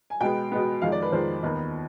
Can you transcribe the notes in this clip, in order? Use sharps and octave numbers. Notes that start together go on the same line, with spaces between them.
G#5
B2 G#3 B3 G5
B2 G#3 B3
F2 D#3 G#3 F5
D5
B4
F2 D#3 G#3 C5
D#2 D#3 B3